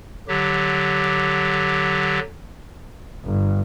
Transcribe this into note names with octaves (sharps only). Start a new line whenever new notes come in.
D3 F#3 G4
G1